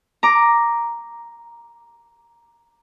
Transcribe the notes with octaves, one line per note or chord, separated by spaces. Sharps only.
A#5 D6